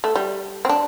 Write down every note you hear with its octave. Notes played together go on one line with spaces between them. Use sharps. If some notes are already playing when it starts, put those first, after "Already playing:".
A3
G3
C4
D4